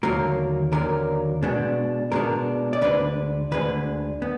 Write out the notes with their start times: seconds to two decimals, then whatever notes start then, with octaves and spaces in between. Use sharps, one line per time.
0.03 D#2 D3 F#3 A#3 A#4
0.72 D#2 D3 F#3 A#3 A#4
1.42 B2 G#3 B3 D4
2.12 B2 G#3 B3 D4 A#4
2.73 D5
2.81 D2 D3 G#3 D4 B4
3.52 D2 D3 G#3 D4 B4
4.22 B3